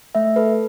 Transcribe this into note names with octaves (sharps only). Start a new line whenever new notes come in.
A3 E5
A4 B4